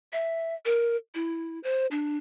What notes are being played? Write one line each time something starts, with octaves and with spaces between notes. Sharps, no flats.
E5
A#4
E4
C5
D4